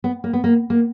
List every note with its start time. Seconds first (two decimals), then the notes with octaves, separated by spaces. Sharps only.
0.04 B3
0.24 A#3
0.33 B3
0.44 A#3
0.70 A#3